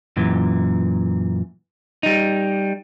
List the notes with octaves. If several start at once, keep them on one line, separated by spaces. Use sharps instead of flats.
F#2 A#2 E3
G3 D#4